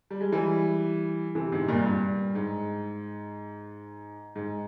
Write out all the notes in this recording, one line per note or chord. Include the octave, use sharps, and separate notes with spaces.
G3
G#3
E3 G3
C3 E3
G#2 C3
G2 A#2
G2
G#2
G#2